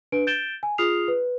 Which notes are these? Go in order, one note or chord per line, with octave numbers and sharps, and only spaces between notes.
D4 B4 D7
G6 A6 D7 E7 G7
G#5
F4 G#4 D#6 F6 C7 F7
B4